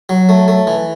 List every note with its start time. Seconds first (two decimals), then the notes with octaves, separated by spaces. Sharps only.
0.09 F#3
0.29 A3
0.48 A3
0.67 E3